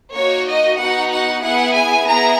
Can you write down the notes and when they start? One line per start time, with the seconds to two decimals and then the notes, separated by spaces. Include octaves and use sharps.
0.13 A#3 D#4 F#4 C#5
0.46 D#5
0.78 B3 D#4 F#4 F#5
1.11 F#5
1.42 B3 E4 G#4 F#5
1.74 G#5
2.07 B3 E4 G#4 A#5